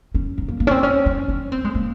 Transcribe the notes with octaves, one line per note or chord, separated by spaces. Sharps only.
C#4
F#3
A#3
A#3
C#4
C4
C#4
C#4
C#4
C4
G#3
A#3